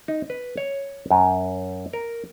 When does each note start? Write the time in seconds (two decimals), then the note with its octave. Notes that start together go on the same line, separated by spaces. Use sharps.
0.08 D#4
0.30 B4
0.57 C#5
1.11 F#2
1.93 A#4